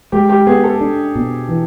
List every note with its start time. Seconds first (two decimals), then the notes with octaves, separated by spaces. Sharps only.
0.12 G#3 G4
0.29 G4
0.47 B3 G#4
0.64 A4
0.81 D4
1.15 B2
1.49 E3